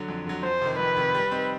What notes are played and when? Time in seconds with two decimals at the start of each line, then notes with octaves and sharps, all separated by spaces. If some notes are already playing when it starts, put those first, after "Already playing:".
Already playing: D3 F#3
0.08 F2
0.27 D3 F#3
0.43 F2 C5
0.61 C3 D#3
0.79 F2 B4
0.97 C3 D#3
1.14 G3
1.31 C4 D#4